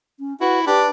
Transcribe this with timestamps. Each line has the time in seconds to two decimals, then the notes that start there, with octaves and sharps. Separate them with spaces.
0.19 C#4
0.41 E4 F#4 B4
0.67 D4 G4 B4